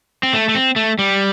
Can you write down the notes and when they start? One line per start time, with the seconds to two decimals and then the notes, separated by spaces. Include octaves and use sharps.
0.23 C4
0.33 A3
0.49 A3
0.55 C4
0.76 A3
0.99 G3